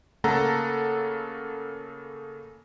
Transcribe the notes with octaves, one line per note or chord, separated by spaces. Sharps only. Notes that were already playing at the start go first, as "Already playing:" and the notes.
C#3 A3 A#3 A4 F#5 A#5